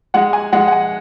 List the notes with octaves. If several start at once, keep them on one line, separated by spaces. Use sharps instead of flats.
G#3 F#5
G#5
G#3 F#5
F#5
G#5